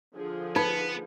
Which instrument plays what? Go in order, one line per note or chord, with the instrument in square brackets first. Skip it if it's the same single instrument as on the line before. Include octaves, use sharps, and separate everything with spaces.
[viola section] D3 F3 G#4
[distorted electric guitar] B3 [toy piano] D#4 [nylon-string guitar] B4